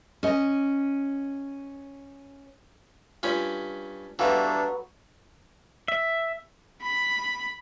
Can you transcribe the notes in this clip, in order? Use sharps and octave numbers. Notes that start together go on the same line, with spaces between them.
C#4 D#5
G2 C#4 F4 B5
E3 F#3 G3 B3 D4 A4 F5
E5
B5